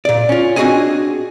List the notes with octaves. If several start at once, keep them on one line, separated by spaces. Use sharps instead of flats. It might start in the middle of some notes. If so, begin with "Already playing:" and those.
A#2 D5
C#4 F4
C4 D4 F#4 G#4 D#5 G#5